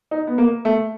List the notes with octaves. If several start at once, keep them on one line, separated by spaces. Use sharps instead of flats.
D#4
B3
A#3
A3